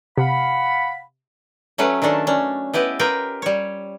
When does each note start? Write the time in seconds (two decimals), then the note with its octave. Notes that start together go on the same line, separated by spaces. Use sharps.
0.17 C3 F5 F#5 B5
1.78 F#3 A3 C#4 B4
2.02 D#3 C#4 D4 A4
2.27 C#4 D4
2.74 B3 E4 G4 B4 D#5
2.99 F4 G4 A#4 B4 G5
3.42 G3 C#5